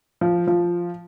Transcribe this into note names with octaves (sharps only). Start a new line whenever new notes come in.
F3
F3